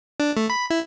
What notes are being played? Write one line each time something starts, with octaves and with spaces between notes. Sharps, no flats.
D4
A3
B5
E4